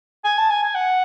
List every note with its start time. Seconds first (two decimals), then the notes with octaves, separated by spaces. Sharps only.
0.24 G#5
0.37 A5
0.50 G#5
0.62 G#5
0.75 F#5